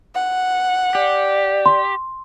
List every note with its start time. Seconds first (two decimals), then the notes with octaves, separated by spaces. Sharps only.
0.15 F#5
0.95 G4 D5
1.66 C6